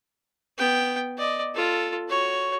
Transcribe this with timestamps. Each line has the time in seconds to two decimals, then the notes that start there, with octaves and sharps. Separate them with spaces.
0.58 B3 G5
1.18 D5 D#5
1.54 F4 A4
2.08 F#4 C#5